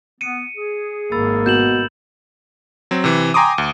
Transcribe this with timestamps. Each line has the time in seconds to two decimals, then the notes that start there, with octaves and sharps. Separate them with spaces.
0.21 B3 C#7 D#7
0.56 G#4
1.12 G#1 A#3 B5 E6 A6
1.46 B2 G6 E7 F#7
2.91 F#3 C4
3.04 C3 E3
3.34 G5 G#5 A#5 C6 D6 D#6
3.58 D2